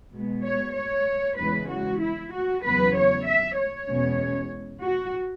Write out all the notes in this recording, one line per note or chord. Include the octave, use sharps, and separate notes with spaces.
B2 G#3 B3
C#5
C#5
E2 C#3 E3 G#3 B4
F#4
E4
F#4
E2 C#3 F#3 B3 B4
C#5
E5
C#5
E2 B2 G#3 C#4
F#4